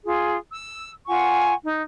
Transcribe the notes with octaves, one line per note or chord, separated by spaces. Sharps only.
F4 G#4
E6
F4 F#5 G#5 C#6
D#4